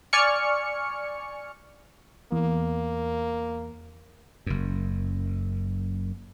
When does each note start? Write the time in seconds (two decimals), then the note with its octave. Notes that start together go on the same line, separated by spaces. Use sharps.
0.13 D5 G#5 C#6 F6 C#7
2.32 E2 A#3
4.46 F#1 F#2